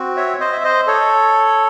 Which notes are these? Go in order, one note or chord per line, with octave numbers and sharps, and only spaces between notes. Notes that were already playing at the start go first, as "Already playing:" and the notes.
Already playing: C4 F#4
C#5 E5
C5 D#5
E5
C5 D#5
A4 C#5